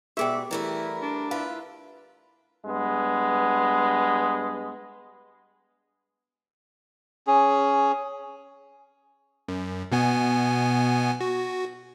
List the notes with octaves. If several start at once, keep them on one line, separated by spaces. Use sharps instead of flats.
G#2 B2 G4 G#4 D5 E5 G5
E3 G3 A3 E4 A#4
D4
E4 F4 B4 F5
G2 G#3 B3
C#4 G#4
F#2
B2 B3 G#5
F#4